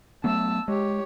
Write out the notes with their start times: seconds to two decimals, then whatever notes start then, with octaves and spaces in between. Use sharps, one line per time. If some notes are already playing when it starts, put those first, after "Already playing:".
0.24 F#3 A3 B3 A5 E6
0.68 G#3 G4 C#5